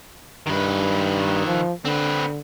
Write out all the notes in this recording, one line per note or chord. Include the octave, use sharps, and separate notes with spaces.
G2 D#3 B4
F3
D3 C4 B4